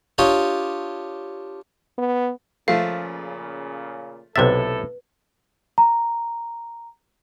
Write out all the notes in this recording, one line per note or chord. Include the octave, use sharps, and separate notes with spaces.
D4 F4 G4 C#5 D#5
B3
A#2 C#3 F3 A3 F5
B1 A2 C3 E4 A4 B4 E5 A6
A#5